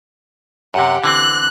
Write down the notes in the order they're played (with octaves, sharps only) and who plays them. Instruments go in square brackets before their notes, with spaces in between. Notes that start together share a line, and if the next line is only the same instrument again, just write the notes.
[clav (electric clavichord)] F#2 C3 [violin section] G4 F#5
[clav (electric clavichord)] D3 E3 C4 [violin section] F#6